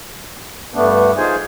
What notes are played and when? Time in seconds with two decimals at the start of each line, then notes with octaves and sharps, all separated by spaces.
0.74 G2 A3 B3 D4
1.17 D#4 F4 G#4 C5 G#5